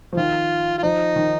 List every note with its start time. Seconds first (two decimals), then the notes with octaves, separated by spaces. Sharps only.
0.13 F3
0.17 D#3 F4
0.78 F4
0.83 F3 D#4
1.16 D#3